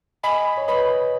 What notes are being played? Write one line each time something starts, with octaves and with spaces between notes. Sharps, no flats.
D#5 G#5 B5
C#5
B4 D#5 B5